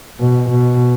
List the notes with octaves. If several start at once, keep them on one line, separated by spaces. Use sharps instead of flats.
B2
B2